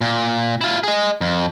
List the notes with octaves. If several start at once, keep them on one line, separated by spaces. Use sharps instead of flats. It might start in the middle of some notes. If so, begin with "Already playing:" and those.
A#2
E4 F4
G#4 D#5
F2